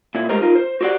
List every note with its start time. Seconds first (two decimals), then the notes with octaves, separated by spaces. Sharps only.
0.15 A#2 E4
0.29 G#3 A3 G4 A#4 C5 D#5
0.41 D#4 F4 A#4
0.55 C5
0.81 F#4 G4 C5 D5 F#5